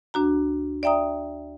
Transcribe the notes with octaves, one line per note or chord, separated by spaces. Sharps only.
D2 D4 F#4 A#5
D5 E5 G5 A#5 D#6